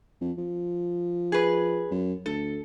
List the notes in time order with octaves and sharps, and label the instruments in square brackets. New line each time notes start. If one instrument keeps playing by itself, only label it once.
[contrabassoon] F2
F3
[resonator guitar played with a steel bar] G#4 B4
[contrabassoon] F#2
[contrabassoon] D2 [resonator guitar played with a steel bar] A4